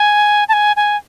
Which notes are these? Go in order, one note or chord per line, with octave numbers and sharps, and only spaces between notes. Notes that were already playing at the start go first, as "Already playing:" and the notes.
Already playing: G#5
A5
G#5
G#5